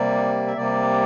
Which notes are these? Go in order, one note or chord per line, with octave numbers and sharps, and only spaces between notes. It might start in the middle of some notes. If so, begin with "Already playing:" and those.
Already playing: C3 G3 A#3 D5
E5
C3 G3 A#3 D5